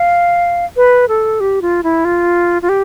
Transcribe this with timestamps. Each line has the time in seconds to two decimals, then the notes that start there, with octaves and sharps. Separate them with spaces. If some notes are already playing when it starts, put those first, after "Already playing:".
Already playing: F5
0.76 B4
1.09 A4
1.40 G4
1.62 F4
1.83 E4
2.05 F4
2.62 F4
2.69 G4